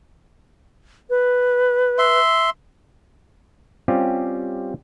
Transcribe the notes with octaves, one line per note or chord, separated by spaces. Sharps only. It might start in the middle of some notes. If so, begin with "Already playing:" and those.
B4
E5 C6
G3 C4 C#4 F4 G4